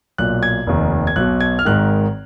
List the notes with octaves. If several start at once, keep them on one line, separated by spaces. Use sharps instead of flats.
B1 A#2 F#6
G#6
F1 D#2 D#3
G#6
B1 B2 F#6
G#6
F6
G#1 G#2 D#3 F#6